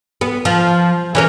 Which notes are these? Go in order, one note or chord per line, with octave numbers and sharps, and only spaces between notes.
B3
F3
E3 C#4 A#4